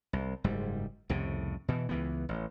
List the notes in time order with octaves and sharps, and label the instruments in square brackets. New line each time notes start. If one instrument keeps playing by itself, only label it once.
[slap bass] C2
F#1 G#2 G3
C2 F2 A2 C#3
B2 E3
C#2 E3 B3
A1